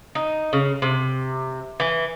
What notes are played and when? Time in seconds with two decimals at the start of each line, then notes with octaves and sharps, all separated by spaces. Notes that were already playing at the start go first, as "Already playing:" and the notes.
0.15 D#4
0.53 C#3
0.82 C3
1.80 E3